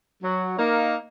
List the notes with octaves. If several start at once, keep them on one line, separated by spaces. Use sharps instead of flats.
F#3
A#3 D#4